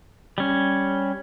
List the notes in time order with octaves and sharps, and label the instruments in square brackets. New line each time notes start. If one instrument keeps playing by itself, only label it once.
[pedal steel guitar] G3 C#4